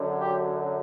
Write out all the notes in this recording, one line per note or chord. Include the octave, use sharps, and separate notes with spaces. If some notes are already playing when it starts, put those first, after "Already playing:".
Already playing: F#2 D3 F#3
G4